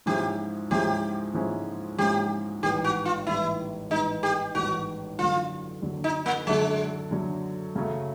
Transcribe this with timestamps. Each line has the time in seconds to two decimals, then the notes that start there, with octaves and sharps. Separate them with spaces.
0.06 G#2 F3 G#3 C#4 E4 G4
0.71 G#2 F3 G#3 C#4 E4 G4
1.34 G#2 F3 G#3 C#4 E4
1.98 G#2 F3 G#3 C#4 E4 G4
2.63 A1 G#2 D#3 G3 B3 G4
2.84 F#4
3.05 F4
3.27 A1 G#2 D#3 G3 B3 E4
3.90 A1 G#2 D#3 G3 B3 D#4
4.23 G4
4.55 A1 G#2 D#3 G3 B3 F#4
5.18 F#2 D3 F#3 F4
5.83 F#2 D3 F#3
6.04 D#4
6.26 A#3
6.47 F#2 D3 F#3 G#3
7.11 F#2 D3 F#3
7.75 F#2 C#3 F#3 A3